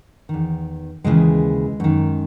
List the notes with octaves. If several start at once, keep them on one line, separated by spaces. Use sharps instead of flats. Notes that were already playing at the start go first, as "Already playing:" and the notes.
E2 D#3
D#2 C#3 E3 G#3
F#2 D#3